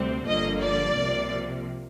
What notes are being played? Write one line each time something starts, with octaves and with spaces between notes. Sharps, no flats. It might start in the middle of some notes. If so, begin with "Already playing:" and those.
Already playing: D2 C3 G3 C4
G1 G2 D3 F3 A#3 D#5
D5
C2 C3 F3 A#3